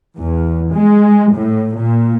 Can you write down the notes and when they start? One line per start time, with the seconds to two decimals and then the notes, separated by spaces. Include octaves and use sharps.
0.19 E2
0.74 G#3
1.35 A2
1.78 A#2